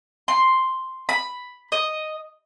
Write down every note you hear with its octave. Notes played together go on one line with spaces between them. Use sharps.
C6
B5
D#5